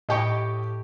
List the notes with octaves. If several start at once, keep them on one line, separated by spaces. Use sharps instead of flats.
A2 G4 D#5 G5 C#6